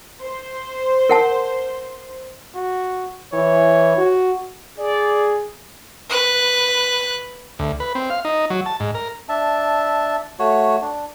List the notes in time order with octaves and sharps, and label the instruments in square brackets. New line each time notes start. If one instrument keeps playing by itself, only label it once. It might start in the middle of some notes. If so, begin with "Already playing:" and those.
[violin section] C5
[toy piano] A#4 F#5 A5
[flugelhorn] F#4
[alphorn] E3 [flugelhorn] C#5
[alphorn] F#4
[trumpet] G#4 [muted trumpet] D5
[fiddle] B4 F#6
[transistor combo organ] D2
B4
C4
F5
D#4
F#3
A5
G#2
A#4
[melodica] D4 E5 A5
A3 F#4 C#5
D4